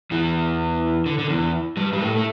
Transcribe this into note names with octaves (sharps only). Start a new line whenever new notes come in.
E2 E3
D3
D3
E2 E3
G2 G3
G3
A2 A3
A3